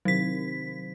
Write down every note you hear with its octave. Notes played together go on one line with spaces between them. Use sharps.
C3 D#3 F#3 B6